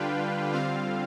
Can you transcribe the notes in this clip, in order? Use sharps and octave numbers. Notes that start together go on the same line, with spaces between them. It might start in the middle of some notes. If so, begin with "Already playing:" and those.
Already playing: D3 G3 D4 F4 B4 F5 G5
D3 G3 C4 F4 F5